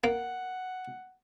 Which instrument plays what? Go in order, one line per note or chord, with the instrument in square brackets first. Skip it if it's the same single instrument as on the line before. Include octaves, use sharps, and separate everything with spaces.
[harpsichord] A#3 [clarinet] F#5